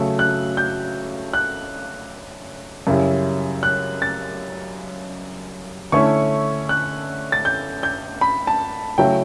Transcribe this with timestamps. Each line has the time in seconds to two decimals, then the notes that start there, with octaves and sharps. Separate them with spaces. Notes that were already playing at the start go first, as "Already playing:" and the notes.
Already playing: C#3 F#3 A3
0.19 F#6
0.57 G6
1.34 F#6
2.87 F#2 C#3 G3 C#4 E4
3.63 F#6
4.02 A6
5.92 D3 A3 C#4 E4 C#6
6.69 F#6
7.32 A6
7.45 G6
7.83 G6
8.21 B5
8.47 A5
8.98 C#3 F#3 A3 E4 G5